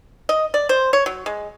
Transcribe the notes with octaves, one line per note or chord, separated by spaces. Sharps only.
D#5
D5
C5
C#5
F#3
G#3